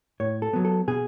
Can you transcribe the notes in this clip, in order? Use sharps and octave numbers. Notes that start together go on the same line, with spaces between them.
A2 C#5
A4
F#3 B3
A4
B2 G#4